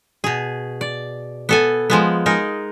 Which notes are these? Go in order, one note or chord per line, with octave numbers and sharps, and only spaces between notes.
B2 G#4
D5
B3 A4 G#5
F3 G#3 B3
G#3 D#4 A#4